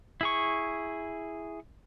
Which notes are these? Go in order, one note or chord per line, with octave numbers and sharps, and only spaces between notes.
E4 G#4 C#6